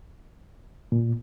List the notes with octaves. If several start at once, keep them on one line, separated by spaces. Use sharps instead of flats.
A#2